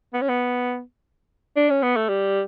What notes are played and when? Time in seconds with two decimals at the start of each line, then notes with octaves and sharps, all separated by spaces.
0.13 B3
0.21 C#4
0.29 B3
1.56 D4
1.70 C#4
1.83 B3
1.96 A3
2.08 G3